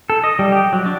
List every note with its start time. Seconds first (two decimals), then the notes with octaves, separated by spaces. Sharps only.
0.10 A4
0.24 D#5
0.39 G3
0.52 G4
0.73 F#3
0.86 D4